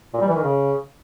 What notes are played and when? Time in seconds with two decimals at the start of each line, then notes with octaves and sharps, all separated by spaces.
0.13 A#2
0.21 G3
0.28 E3
0.36 D#3
0.43 C#3